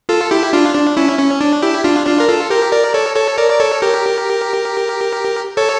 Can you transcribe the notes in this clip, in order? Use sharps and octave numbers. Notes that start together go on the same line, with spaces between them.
F4 A4
E4 G4
D4 F4
D4
C#4 E4
C#4
D4
E4 G4
D4 F4
D4 F4
A#4
F4 A4
G4 A#4
A#4 D5
A4 C#5
A4 C#5
A#4 D5
D5
A4 C#5
G4 A#4
A4 C#5